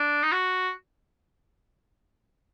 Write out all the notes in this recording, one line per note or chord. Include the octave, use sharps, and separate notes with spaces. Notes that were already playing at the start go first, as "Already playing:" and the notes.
Already playing: D4
D#4
F#4